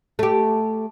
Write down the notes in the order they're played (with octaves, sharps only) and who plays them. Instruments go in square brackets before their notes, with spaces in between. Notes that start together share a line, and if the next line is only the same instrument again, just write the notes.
[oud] A3 G4